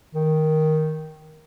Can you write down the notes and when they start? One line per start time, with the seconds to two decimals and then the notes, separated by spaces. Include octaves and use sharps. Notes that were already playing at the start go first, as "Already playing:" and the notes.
0.15 D#3